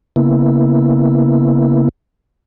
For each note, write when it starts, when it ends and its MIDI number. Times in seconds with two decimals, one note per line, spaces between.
0.16 1.89 49
0.16 1.89 58
0.16 1.89 59
0.16 1.89 64